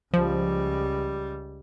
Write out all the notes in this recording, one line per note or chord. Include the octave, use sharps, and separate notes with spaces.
C#2 F3 G3